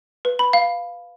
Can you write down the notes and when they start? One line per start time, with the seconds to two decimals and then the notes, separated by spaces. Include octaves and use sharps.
0.25 B4
0.39 B5
0.53 F5